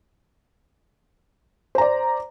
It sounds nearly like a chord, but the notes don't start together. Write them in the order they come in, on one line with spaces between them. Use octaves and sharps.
C5 A#5 D5